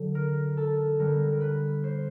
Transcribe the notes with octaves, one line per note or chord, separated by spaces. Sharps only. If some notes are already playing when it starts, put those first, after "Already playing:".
Already playing: D3 F#3
A#4
A4
D3 G3 B3 A#4
A#4
B4
C5